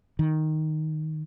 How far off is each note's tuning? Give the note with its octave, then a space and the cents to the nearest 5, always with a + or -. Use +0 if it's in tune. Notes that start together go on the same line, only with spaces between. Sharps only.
D#3 +0